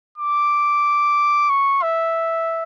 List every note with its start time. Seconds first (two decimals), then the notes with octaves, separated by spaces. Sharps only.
0.18 D6
1.50 C#6
1.83 E5